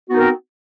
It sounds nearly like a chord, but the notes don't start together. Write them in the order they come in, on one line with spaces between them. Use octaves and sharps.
F#4 B3 D#4 A#4 C4